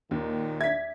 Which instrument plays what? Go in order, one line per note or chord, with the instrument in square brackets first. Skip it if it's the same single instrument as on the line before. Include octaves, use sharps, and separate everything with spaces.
[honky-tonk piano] D#2 [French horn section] A#2 D#3
[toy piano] D5 E5 [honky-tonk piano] G#6 B6